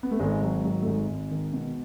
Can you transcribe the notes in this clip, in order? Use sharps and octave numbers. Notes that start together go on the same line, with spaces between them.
B3
A3
G#1 G#3
D#3 F#3
G#2 F#3
A3
G#1 G#3
G#1
D#3
B2